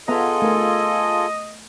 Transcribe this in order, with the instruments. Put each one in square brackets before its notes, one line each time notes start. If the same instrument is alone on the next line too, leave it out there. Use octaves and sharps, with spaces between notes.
[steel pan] B3 E5 A#5 [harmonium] F4 G#4 A4 [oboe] D#5
[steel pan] A3 A#4